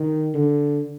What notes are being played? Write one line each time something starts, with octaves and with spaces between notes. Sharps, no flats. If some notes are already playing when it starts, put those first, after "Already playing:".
Already playing: D#3
D3